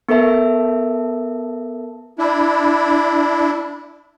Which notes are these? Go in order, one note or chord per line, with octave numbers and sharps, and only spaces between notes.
B3 A4 A#4 E5 A5
D4 E4